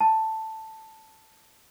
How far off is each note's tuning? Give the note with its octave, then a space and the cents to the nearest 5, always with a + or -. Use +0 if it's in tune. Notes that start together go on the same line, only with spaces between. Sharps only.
A5 +5